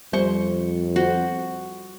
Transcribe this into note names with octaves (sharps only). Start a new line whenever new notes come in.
F2 G3 C5 C#6
F#4 C5